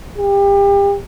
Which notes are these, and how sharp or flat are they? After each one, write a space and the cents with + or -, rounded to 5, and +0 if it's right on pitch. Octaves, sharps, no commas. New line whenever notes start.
G4 +30